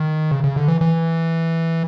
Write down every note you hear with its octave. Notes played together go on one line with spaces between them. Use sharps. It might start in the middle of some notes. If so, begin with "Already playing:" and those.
Already playing: D#3
C#3
C#3
D3
E3
E3